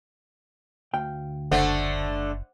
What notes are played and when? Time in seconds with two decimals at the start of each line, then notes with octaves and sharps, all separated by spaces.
0.94 D2 F5 G5
1.51 F#1 D3 A3 C5 F#5